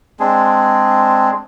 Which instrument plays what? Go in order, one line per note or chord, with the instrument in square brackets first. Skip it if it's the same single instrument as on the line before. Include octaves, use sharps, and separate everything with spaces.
[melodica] G#3 C4 D4 G#4